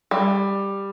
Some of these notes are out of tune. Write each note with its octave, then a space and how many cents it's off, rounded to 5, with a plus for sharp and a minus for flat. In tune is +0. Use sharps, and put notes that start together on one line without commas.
G3 +10